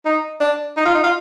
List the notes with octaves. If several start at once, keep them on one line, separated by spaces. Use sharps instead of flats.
D#4
D4
D#4
F4
D#4
F4